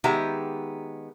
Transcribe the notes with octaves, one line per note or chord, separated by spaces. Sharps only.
D#3 G#3 B3 G4 E5 A#5